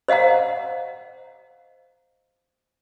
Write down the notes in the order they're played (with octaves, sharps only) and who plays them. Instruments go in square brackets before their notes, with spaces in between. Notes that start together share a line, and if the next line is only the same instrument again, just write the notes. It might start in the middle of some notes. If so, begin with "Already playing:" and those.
[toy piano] C5 D#5 F5 F#5 A#5